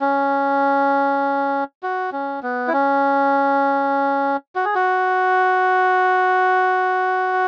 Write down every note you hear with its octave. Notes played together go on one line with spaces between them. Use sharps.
C#4
F#4
C#4
B3
E4
C#4
F#4
G#4
F#4